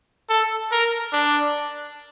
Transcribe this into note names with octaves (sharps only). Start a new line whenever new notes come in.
A4
A#4
D4